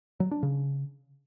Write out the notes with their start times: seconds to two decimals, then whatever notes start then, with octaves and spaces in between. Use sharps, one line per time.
0.20 F#3
0.31 D4
0.43 C#3